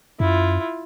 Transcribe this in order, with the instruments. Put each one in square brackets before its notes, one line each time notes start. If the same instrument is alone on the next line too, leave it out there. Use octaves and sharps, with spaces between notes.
[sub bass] F#2 [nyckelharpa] E4 F4